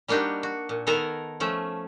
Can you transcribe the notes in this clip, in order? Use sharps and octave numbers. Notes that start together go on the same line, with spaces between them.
G3 A#3 D4 D#4 F#4 G4
F#4
A#2
D#3 B3 A4 A#4 G#5 A#5
F3 A3 C#4